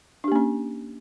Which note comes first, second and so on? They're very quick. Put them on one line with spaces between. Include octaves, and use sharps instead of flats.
D4 G4 A#3 C#4